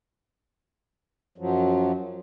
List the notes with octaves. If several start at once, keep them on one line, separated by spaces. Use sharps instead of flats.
F#2 F3 F#3